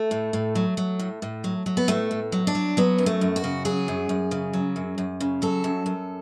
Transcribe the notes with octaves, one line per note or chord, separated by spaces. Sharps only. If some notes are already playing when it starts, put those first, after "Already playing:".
Already playing: A3
A2
A2
F#3
F#3
A2
A2
F#3
F#3
B3
A2 A3
A2
F#3
D4
F#3
F#3 B3
F#2
A3
F#2
F#4
C#3
F#3 G#4
F#2
F#2
C#3
F#3
F#2
F#2
C#3
F#3 A4
F#2
F#2